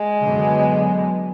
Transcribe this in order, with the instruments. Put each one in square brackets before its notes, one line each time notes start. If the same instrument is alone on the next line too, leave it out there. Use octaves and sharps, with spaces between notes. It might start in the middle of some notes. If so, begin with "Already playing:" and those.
Already playing: [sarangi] G#3
[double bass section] F#2 D3 F#3 B3